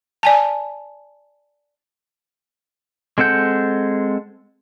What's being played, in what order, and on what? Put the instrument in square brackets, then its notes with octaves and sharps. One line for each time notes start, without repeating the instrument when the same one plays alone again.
[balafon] D5 G#5 A5
[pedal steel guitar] G#3 C4 A4 F#5 G6